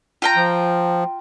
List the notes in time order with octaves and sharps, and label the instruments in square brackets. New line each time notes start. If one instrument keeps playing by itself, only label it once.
[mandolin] F4 G5 A#5
[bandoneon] F3